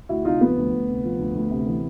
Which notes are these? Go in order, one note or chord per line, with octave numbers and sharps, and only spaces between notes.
D2 E4 F#4
C3 D#4 F4
F3 B3
D2
D2
C3
F3
D2
D2
C3
E3